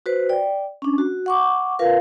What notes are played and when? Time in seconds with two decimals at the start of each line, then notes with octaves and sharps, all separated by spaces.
0.06 F#4 B4 C5
0.29 D5 G5
0.82 C#4 D4
0.98 F#4
1.26 F#5 C#6 D6
1.79 F4 A#4 B4 F5